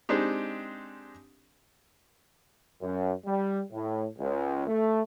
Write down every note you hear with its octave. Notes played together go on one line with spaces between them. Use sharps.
G#3 C4 D4 D#4 G4
F#2
G3
A2
C#2
A3